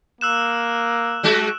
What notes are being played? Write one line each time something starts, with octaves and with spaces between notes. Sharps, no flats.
A#3 E6 F#6 E7
G3 G#3 F#4